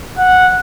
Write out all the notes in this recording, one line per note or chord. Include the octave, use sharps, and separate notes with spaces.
F#5